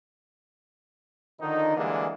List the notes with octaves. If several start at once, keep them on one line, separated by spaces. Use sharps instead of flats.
D3 D#3 F3 D#4
D3 E3 G3 G#3 A#3